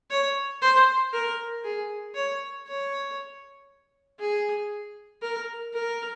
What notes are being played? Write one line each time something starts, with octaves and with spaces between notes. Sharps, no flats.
C#5
C5
A#4
G#4
C#5
C#5
G#4
A#4
A#4